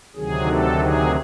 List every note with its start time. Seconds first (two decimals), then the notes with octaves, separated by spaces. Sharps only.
0.16 D2 C3 D#3 F#3 G#4
0.47 A4
0.78 G#4